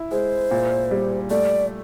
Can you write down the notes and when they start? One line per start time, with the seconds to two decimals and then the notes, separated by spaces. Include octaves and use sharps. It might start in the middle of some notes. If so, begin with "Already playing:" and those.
Already playing: E4
0.11 G#3 C5
0.51 A#2
0.91 G3
1.30 A3 D5